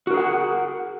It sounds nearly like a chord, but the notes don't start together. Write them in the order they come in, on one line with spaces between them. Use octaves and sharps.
F#4 A#4 G#4 F#5